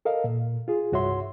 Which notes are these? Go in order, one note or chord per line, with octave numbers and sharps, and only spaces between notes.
A4 A#4 D#5 F5
A#2
F4 G#4
C2 G2 F#4 C#5 E5 C6